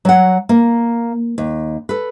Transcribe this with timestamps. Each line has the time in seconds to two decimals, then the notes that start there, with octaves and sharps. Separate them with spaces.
0.05 F#3 F#5
0.49 A#3
1.38 D#2
1.89 A4 B4